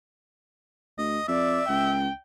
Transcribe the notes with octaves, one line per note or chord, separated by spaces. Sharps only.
D2 D#5
F2 D5 E5
C#2 G5